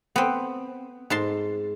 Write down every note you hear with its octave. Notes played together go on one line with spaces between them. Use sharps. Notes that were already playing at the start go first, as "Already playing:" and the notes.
B3 C4
G#2 A5 C6